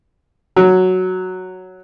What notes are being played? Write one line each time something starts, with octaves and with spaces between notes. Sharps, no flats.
F#3